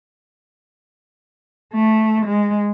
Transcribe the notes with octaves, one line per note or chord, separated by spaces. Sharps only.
A3
G#3